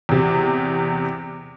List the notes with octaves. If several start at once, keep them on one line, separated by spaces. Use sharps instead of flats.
E2 C3